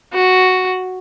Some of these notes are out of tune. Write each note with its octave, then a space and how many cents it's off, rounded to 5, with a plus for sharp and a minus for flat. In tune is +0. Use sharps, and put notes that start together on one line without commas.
F#4 +0